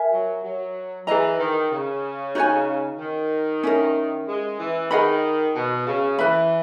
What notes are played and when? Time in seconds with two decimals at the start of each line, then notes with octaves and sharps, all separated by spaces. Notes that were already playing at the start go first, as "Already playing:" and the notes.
Already playing: A#4 E5 G#5
0.11 F#3
0.43 F#3
1.07 E3 G#4 D#5 A#5
1.39 D#3
1.71 C#3
2.35 D#4 F#4 C#5 G#5
2.99 D#3
3.63 C#4 E4 A#4
4.27 G#3
4.59 E3
4.91 D#3 G#4 D#5 F#5 B5
5.55 B2
5.87 C#3
6.18 E3 B4 E5 B5